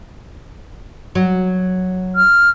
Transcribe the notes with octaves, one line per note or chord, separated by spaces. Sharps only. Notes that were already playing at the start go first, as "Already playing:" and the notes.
F#3
F6